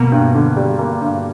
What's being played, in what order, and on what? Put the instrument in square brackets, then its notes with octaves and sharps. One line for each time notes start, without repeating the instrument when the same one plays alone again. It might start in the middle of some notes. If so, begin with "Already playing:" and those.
Already playing: [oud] B2 B3 [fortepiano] A#3
[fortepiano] G2
D3
G3
A#3
G2